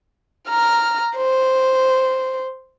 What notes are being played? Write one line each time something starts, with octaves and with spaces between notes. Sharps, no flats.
A#5 F6
C5